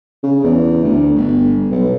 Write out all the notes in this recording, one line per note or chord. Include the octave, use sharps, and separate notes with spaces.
C#3
E2
D2
G1
B1